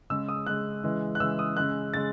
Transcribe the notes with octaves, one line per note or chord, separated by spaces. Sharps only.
C#3 G#3 E6
D#6
C#3 G#3 F#6
C#3 E3 G#3
F#6
C#3 E3 G#3 E6
D#6
C#3 G#3 F#6
C#3 G#3 A6